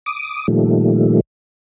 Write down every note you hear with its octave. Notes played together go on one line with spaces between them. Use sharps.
D6 D#6
A#2 D#3 F3 G3 A3